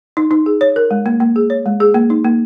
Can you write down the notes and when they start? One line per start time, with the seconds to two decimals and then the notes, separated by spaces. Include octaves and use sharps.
0.17 D#4
0.31 D#4
0.46 G#4
0.61 C#5
0.76 A#4
0.91 G#3
1.06 A#3
1.20 A#3
1.36 G#4
1.50 C#5
1.66 G#3
1.80 G#4
1.94 A#3
2.10 D#4
2.24 A#3